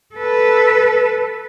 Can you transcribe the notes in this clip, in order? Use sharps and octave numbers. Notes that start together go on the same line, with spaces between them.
A4 B4